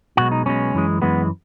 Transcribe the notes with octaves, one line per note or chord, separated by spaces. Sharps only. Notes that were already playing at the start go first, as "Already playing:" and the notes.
B1 B2 G#3 F#4
D#4
B1 B2 G#3 C#4
F#2 E3 G#3
F#2 E3 G#3 B3